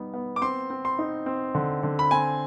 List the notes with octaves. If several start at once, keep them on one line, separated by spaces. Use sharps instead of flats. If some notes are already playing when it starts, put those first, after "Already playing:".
Already playing: G3 B3 D#4
B3
D6
C4 C6
C4
C6
D#4
C4
D3
D3
B5
C4 G#5